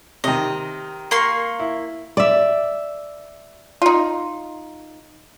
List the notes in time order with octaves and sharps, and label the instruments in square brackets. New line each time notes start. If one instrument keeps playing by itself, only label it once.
[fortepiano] C3 D#3 [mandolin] D#5
[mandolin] A#3 C6 C#6
[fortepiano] E4
[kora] D5 E5
[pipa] D#4 F4